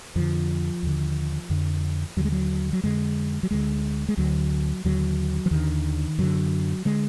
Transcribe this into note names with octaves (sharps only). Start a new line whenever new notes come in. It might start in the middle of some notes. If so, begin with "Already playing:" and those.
F2 D3 F3
D#2 D3
F2 D3
D#2 D3 F#3
G#3
F#3
F#3
F2 D3 G#3
F#3
D2 D3 G#3
G#3
D2 D3 F#3
D#2 D3 F#3
F3
D#2 D3 D#3
F#2 D3 F#3
D3 G#3